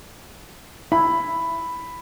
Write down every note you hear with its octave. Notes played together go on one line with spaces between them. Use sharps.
E4 B5